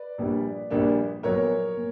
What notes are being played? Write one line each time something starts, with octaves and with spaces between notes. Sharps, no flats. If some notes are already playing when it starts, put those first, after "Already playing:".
Already playing: B4 D5
A#1 A#2 G3 A#3 D4
A#1 A#2 G3 A#3 D4
A#1 A#2 F#3 B3 A#4 C#5
A#2